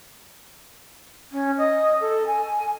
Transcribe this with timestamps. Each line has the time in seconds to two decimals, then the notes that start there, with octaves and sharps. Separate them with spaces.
1.32 C#4
1.58 D#5
2.00 A4
2.27 G#5